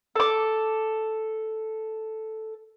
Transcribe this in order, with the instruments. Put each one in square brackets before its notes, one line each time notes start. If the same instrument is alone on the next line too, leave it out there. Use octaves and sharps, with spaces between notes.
[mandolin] A4 D6